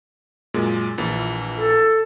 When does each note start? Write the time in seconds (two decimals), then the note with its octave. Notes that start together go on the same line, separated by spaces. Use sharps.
0.54 F#2 A#2 G#3
0.98 A#1 E3 A6
1.57 A4